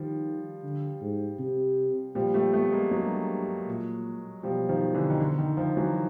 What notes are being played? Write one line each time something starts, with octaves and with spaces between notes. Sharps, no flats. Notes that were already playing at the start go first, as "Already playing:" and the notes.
Already playing: D#3 F3 G3
D3
G#2
C3
A#2 F3 G3
G3 A3
A3 B3
G#3 A#3
G2 F#3 G#3
A#2
B2 F3 G3
D#3 F3
D3 E3
D#3
D3
D#3
D#3 F3
E3 F#3